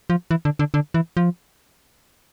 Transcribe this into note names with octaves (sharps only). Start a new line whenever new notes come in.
F3
E3
D3
D3
D3
E3
F3